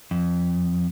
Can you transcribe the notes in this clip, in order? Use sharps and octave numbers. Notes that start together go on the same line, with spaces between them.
F2